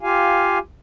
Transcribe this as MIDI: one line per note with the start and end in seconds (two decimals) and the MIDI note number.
0.01 0.58 65
0.01 0.58 67
0.01 0.58 77
0.01 0.58 80